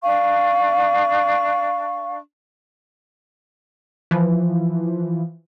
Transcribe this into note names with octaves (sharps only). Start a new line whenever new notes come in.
D4 F5 C#6
E3 F3